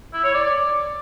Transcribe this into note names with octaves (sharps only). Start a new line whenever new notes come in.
E4
C#5
D5